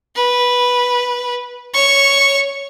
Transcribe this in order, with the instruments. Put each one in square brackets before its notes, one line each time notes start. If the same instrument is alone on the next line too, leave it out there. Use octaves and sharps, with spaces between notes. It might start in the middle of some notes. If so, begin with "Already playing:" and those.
[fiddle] B4
C#5 C#6